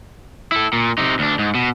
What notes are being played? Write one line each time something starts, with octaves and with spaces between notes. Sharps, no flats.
E4 A4
A#2
C3 D#4
D2 D4
G#2
B2